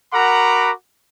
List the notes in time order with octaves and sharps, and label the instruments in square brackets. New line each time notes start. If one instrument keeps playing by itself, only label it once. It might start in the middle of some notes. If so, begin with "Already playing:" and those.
[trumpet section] F#4 A#4 F#5 A#5 B5 D6